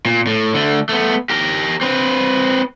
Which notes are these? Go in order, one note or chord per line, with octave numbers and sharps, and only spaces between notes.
A#2
A2
D3 A3
A3 B3
G4 A#4
C4 B4